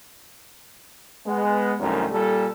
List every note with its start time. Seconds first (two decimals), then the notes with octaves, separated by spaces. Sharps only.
1.26 G#3 B3
1.80 C2 F#2 D#3 A3 A#4
2.11 A#2 G3 A4